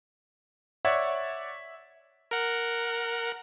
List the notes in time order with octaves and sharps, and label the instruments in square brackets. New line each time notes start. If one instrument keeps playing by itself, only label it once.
[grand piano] C#5 D5 F#5 [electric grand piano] E5
[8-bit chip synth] A#4 F#5